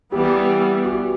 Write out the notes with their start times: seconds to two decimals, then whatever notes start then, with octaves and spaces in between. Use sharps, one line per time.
0.12 E3 G3 B3 G4
0.85 F#4